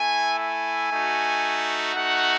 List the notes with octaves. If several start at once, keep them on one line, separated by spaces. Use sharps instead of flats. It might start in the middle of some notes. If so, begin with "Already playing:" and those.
Already playing: A3 E4 G#5
G#5
A3 D#4 F#4
A3 D#4 F#4 F#5